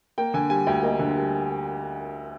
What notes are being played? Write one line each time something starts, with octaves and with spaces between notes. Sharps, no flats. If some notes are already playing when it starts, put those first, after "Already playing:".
A#3 G5
D3 G#5
G3 G#5
D2 G5
A#3 D#5
D3
G3